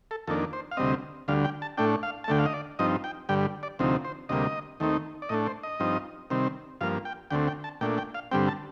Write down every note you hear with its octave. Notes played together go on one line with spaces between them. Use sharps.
A4
F2 D#3 A#3 D4 A4
C5
F5
D2 C3 G3 C4 D#5
D2 D3 G3 F5
G5
A5
A2 A3 D4 G5
F5
A5
D2 D3 A3 G5
F5
D#5
D5
G2 F3 C4 D#4 D#5
G5
G2 D3 G3 G5
D5
D2 C3 F3 C4 D#4
C5
D2 C3 G3 A#3 D#5
D#2 D#3 A3 C4 D#4
D5
A2 A3 D4 D#5
C5
D#5
G2 F3 C4 D#4
C3 D#3 G3 C4
G2 F3 A#3 F5
G5
D2 D3 A3 C4 G5
G5
A5
A#2 A3 D4 G5
G5
F5
G2 D3 G3 C4 G5
A5